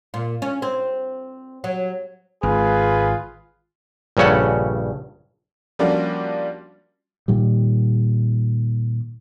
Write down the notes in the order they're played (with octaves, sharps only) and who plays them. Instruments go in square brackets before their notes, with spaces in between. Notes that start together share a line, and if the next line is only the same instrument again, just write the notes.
[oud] A#2
C#4
C4
F#3
[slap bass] G#1 [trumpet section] F4 G#4 B4
[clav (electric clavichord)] A#1 G2 C#3 C#4 A4 F#5
[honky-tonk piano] F3 G3 A#3 C#4 D4 F#4
[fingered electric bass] A#2 D#3 G3